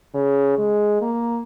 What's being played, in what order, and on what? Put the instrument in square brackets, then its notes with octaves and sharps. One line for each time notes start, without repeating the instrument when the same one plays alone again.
[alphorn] C#3
G#3
A#3